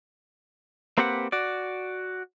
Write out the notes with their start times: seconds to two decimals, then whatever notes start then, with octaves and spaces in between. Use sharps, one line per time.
0.98 A#3 C4 G4 B4 F#5
1.32 F#4 D5